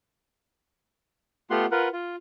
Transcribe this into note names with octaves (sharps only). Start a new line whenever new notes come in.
A3 B3 F4 G4 F#5 C6
F4 A#4 B4 F#5
F4